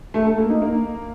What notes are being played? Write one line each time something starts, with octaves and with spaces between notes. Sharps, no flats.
A3
A4
A#3
D#4
A#3